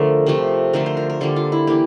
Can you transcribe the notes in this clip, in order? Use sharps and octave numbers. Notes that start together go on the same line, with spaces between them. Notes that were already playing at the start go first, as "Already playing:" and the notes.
Already playing: D3 F3 A3 A#4
C3 F3 A3
D3 F3 A3 A#4
C5
A#4
A#4
D3 G3 A#3 A4
F4
E4
E3 A#3 G4